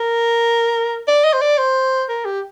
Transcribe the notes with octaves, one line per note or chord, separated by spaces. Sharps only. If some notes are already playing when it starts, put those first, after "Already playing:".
Already playing: A#4
D5
D#5
C5
D5
C5
A#4
G4